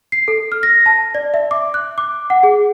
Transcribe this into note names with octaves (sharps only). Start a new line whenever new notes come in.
C7
A4
F6
A#6
A5
D5
E5
D6
F#6
D6
F#5
G#4